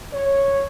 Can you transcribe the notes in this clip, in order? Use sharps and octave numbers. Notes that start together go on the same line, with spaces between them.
C#5